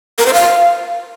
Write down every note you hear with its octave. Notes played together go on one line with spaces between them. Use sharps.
A#4
C5
F5